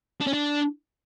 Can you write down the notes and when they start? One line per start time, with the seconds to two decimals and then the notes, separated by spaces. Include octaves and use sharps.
0.21 D4
0.27 C#4
0.33 D4